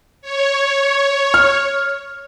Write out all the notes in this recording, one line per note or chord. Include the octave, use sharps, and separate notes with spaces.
C#5
F6